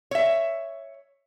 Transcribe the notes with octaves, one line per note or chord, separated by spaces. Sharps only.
C#5 E5